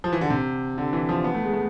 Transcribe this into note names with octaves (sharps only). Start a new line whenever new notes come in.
F3
E3
D3
C3
D3
E3
F3
B3
A3
G#3
A3